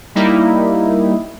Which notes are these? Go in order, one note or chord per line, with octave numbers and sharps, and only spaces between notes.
G3 A#3 D#4 E4